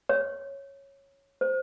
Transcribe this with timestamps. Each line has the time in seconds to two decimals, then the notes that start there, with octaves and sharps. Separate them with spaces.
0.09 C#5
1.41 C5